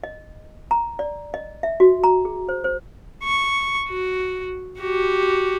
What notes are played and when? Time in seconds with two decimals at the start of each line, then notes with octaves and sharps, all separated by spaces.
0.03 D#5
0.71 A#5
0.99 D5
1.34 D#5
1.63 E5
1.80 F#4
2.04 A#5
2.25 G#4
2.49 C5
2.64 C5
3.24 C#6
3.89 F#4
4.79 F#4 G4